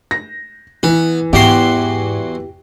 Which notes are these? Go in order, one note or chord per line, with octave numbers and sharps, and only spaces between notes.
A#6
E3 B3
E2 G#2 F#4 G4 C6